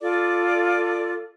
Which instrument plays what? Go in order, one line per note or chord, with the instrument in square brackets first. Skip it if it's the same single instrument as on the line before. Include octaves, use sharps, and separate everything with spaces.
[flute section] F4 A4 D5 D6